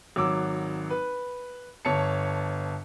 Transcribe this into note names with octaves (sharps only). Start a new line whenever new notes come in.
G#1 F#3 D6 E6
B4
G1 C#5 A5 C#7